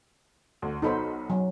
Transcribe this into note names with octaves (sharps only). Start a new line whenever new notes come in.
D2
B1 D#4 F#4 A4 C5 B5
F#3